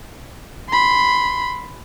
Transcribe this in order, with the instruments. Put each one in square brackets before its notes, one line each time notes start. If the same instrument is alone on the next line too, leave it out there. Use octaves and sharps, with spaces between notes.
[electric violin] B5 C6